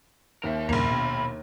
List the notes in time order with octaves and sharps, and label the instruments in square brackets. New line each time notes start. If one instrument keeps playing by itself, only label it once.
[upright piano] D#2 [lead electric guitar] A#4 E5
[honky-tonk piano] A#1 A#3 [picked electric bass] E2 G2 C#3 [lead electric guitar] A#5 B5
[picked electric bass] B2